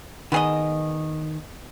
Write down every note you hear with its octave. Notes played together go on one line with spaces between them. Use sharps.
D#3 B3 G#4 D#5